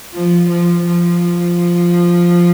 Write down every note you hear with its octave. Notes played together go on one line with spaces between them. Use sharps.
F3
F3
F3